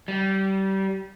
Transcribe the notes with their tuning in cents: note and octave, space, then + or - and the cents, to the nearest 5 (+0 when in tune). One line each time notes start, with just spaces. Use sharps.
G3 -25